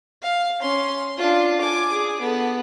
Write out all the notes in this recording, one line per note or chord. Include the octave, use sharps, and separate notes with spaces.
F5
C#4 C6
D4 F4
G#5 D6
G#4
B3 A4